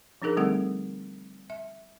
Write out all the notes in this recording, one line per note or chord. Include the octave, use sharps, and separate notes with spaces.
F3 D4 D#4 G#4 A#4
D3 G3 A3 C4 A4 F#5
E5